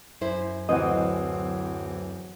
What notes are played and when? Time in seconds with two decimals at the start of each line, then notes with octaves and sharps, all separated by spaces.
0.21 F#2 E4 C5
0.69 D1 E3 C4 D#5 F#5 D#6